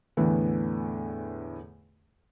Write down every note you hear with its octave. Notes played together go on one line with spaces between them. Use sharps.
E2 A2 D3 E3 B3